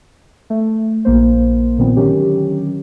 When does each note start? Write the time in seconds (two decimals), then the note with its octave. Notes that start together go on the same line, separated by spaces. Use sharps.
0.50 A3
1.05 A#1 A#3 C5
1.78 A#2 D#3 F3 B3 C4
1.96 D3 D#3 F#3 C#4 G4